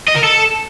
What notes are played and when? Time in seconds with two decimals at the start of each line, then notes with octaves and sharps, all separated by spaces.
0.08 D#5
0.16 A#4
0.23 A4